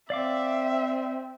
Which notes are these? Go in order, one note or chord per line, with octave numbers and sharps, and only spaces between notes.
C4 D5 E5 F5 D6